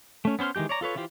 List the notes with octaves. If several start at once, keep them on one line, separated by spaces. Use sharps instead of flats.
A3 C#4
B3 C#4 C5 C6 F6
D#3 E3 G#3 G4 G6
C#5 D5 A#5
F4 A4 B4 C#5
E3 E4 F4 G4 C5